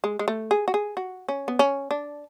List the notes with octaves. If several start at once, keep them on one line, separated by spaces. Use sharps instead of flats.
G#3
G#3
A3
G#4
F#4
G#4
F#4
C#4
B3
C#4
D4